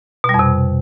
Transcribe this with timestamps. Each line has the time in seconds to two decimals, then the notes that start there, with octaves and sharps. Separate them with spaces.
0.24 B2
0.29 G3
0.34 F2
0.39 C3